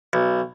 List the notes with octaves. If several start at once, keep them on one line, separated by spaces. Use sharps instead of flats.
B1